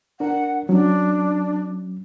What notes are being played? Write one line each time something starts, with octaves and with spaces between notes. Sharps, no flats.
D4 A#4 F#5
F#3 C#4 D4